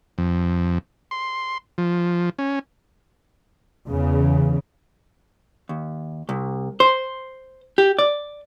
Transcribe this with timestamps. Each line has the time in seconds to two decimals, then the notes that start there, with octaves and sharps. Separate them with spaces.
0.18 F2
1.11 C6
1.78 F3
2.39 C#4
3.87 E2 C#3
5.69 D#2
6.29 C2
6.80 C5
7.78 G4
7.99 D5